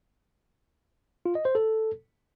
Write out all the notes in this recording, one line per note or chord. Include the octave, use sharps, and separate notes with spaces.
F4
D#5
C5
A4